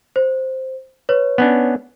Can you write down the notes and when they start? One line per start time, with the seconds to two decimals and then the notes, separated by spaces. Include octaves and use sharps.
0.16 C5
1.09 B4 C#5
1.38 B3 C#4 D4